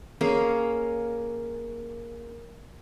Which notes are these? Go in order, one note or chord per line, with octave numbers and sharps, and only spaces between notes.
A#3 C#4 G#4 F5